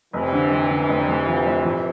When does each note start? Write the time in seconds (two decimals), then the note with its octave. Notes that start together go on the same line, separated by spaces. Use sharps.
0.13 F1 C3 E3
0.32 D3
0.51 F1
0.70 D3
0.89 F1
1.08 F1
1.27 F3
1.46 F1
1.65 F2